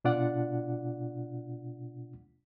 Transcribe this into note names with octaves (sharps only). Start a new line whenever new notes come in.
B2 D4 F4 D5 F#5